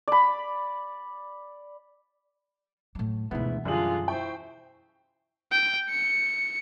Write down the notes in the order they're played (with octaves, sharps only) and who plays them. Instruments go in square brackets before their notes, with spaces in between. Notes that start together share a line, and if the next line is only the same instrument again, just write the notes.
[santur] D5 B5
[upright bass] A2 F#3
[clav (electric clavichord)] D2 G#2 B3 [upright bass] B2 E3 [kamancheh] E4
[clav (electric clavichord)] F#2 G3 [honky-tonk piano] D3 D4 F#7 [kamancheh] F4 G#4
[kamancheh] E4 C5 [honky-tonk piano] G5 C#6
[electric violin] G5
C#7